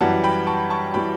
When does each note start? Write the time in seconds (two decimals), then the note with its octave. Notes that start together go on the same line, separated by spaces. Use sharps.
0.01 F#2 E3 G3 F#5 A5
0.24 G5 B5
0.47 A5 C#6
0.70 A5 C#6
0.94 E3 G3 G5 B5